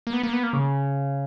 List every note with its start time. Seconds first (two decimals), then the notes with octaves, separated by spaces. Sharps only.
0.07 A#3
0.13 B3
0.23 A#3
0.33 B3
0.43 A#3
0.53 C#3